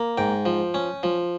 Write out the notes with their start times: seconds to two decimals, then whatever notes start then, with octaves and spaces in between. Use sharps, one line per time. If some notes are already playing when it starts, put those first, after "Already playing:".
Already playing: A#3
0.18 G#2 G5
0.46 F3
0.74 C#4
1.03 F3